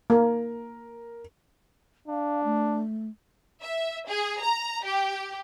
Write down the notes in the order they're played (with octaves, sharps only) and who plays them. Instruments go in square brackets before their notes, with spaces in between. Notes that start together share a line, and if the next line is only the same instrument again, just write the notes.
[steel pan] A#3 [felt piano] A#4
[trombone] D4 [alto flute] F5
[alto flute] A3
[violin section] E5
G#4
A#5
G4